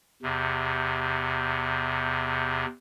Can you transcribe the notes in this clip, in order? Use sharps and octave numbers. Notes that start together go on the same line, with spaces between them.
E2 C3